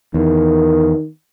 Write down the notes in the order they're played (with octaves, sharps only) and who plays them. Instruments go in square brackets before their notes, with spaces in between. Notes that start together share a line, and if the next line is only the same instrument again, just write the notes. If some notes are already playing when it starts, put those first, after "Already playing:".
[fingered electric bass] E2 [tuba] D#3